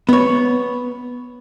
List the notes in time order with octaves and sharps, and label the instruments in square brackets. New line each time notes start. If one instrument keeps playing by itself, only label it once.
[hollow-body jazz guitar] B3 C#5